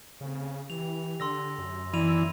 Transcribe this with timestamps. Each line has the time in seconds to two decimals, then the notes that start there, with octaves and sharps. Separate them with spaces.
0.21 D#2 C#3 A3 C4
0.70 E3 G4 F7
1.20 D3 C6 E6 A#6
1.58 F#2
1.93 D#3 E3 B3 D5 B5 D#7 F7